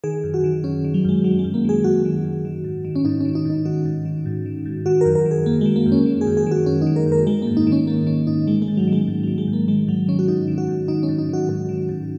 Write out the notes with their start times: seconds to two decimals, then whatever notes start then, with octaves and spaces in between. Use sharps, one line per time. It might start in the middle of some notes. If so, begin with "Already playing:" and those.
0.04 D#3 G#4
0.24 F#2
0.34 F#4
0.44 D#3
0.64 F#2 C#4
0.85 D#3
0.94 F#3
1.05 F#2 G#3
1.24 D#3 F#3
1.39 G#3
1.44 F#2
1.54 A#3
1.65 D#3 G#4
1.84 F#2 F#4
2.05 D#3
2.25 F#2
2.45 D#3
2.64 G#2
2.85 D#3
2.96 C#4
3.05 G#2 D#4
3.20 D#3 C#4
3.35 D#4
3.45 G#2 D#4
3.65 D#3 F#4
3.85 G#2
4.05 D#3
4.26 G#2
4.46 D#3
4.66 G#2
4.86 D#3 F#4
5.01 F#2 A#4
5.15 A#4
5.26 D#3
5.31 G#4
5.46 F#2 A#3
5.61 D#3 G#3
5.76 A#3
5.86 F#2
5.92 C#4
6.06 D#3
6.21 G#4
6.27 F#2
6.37 G#4
6.46 D#3 F#4
6.66 F#2 C#4
6.82 D#4
6.87 D#3
6.96 A#4
7.06 F#2
7.12 A#4
7.27 D#3 G#3
7.42 G#2 A#3
7.57 D#4
7.67 D#3
7.72 C#4
7.87 G#2 A#3
8.07 D#3 C#4
8.27 G#2 D#4
8.47 D#3 G#3
8.62 G#3
8.68 G#2
8.77 F#3
8.88 D#3 G#3
9.07 G#2
9.23 D#3 F#3
9.38 G#3
9.48 G#2
9.53 A#3
9.68 D#3 G#3
9.88 G#2 F#3
10.08 D#3 C#4
10.19 F#4
10.28 G#2 D#4
10.48 D#3
10.58 F#4
10.68 G#2
10.88 D#3 D#4
11.03 C#4
11.09 G#2
11.18 D#4
11.29 D#3 F#4
11.49 G#2 F#4
11.69 D#3
11.89 G#2